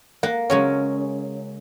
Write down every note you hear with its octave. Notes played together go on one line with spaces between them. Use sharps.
A#3 F#5
C#3 F#3 G#3 C#4